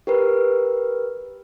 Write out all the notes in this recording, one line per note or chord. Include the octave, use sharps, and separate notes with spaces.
G4 A#4 B4